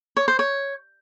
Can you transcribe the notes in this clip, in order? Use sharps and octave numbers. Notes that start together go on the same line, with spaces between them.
C#5
C5
C#5